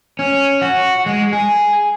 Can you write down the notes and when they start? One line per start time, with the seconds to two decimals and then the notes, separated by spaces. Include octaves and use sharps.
0.19 C#4
0.62 F#4
1.06 G#3
1.33 G#4